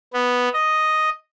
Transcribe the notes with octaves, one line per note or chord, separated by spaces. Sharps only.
B3
D#5